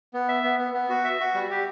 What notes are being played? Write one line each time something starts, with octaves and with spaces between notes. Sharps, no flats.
B3
E5
B3
B3
B3
F#4
E5
F#4
G3
G4